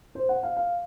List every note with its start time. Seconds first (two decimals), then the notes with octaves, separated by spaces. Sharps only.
0.15 C5
0.29 F#5
0.43 F5
0.56 F5